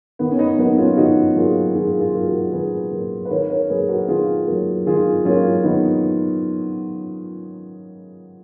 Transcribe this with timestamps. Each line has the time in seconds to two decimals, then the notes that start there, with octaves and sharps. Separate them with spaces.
0.19 D#3 B3
0.31 C#4
0.39 B3 D#4
0.59 F#3 A#3 B3 D#4
0.78 C#4 F4
0.97 D#3 D#4 F#4
1.36 F#3 A#3 F4 G#4
1.75 D#3 F4 G#4
1.91 A#4
2.00 F4 G#4
2.14 F#3 A#3
2.27 F#4 A#4
2.53 D#3 G#4 B4
2.92 F#3 A#3
3.25 B4
3.30 D#3 A#4 C#5
3.50 A#4 C#5
3.69 F#3 A#3 G#4 B4
3.88 F#4 A#4
4.08 D#3 F4 G#4
4.47 F#3 A#3
4.86 D#3 F4 G#4
5.25 F#3 A#3 C#4 F4
5.64 D#3 B3 D#4